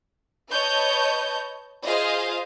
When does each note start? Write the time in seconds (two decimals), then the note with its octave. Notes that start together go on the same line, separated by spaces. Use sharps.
0.50 B4 C#5 D#5 A5 G6
1.85 F4 G#4 C5 D#5 F5